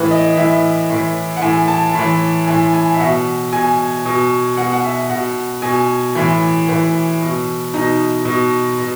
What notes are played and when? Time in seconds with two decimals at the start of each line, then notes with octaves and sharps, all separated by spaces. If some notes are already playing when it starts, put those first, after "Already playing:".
Already playing: A2 E3 B4
0.11 D#5
0.37 A2 E3 E5
0.90 A2 E3
1.37 F#5
1.42 A2 E3 G#5
1.68 A5
1.95 A2 E3
2.47 A2 E3 G#5
2.74 G#5
2.94 E5
2.99 B2 F#5
3.52 B2 G#5
4.05 B2
4.57 B2 F#5
4.73 F#5
4.84 E5
5.10 B2 F#5
5.62 B2 G#5
6.15 A2 E3
6.68 A2 E3 B4
7.21 B2
7.74 B2 D#4
8.25 B2
8.79 B2